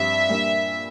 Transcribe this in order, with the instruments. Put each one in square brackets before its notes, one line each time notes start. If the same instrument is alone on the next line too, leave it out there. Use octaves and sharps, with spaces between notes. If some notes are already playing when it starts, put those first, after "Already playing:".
Already playing: [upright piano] G2 F3 C4 G4 [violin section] E5
[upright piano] A#2 G3 A#3 D4